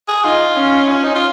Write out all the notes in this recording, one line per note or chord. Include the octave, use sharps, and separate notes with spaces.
G#4
D#4 F4
C#4
C#4
D#4
F4